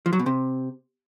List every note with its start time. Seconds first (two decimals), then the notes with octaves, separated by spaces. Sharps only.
0.06 F3
0.13 F#3
0.19 B2
0.26 C3